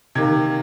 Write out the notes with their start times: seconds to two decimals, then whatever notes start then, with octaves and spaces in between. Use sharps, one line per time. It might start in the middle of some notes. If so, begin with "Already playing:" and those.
0.15 C3 D#3 A#3 G#6